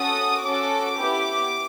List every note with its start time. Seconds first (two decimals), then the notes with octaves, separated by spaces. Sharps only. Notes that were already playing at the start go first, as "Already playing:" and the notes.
Already playing: C#4 F#4 A4 D#6
0.44 C#4 F#4 A4 D6
0.98 B3 E4 G4